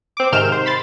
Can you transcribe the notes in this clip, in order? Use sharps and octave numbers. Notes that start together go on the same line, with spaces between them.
C4 D6
G#2 C3 D#3 F6 G6 E7
C5
B5 C6 A6